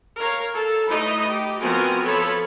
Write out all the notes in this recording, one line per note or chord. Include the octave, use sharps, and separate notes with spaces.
A#4 C#5 F5
A4
A3 D#4 E4 B4 D#5
G4
F3 B3 C4 F#4 A#4 G#5
F3 A4 C#5 B5